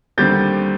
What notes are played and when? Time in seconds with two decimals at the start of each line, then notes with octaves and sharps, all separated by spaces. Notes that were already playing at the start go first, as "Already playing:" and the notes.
0.18 D#2 D3 G3 C4 G6 A6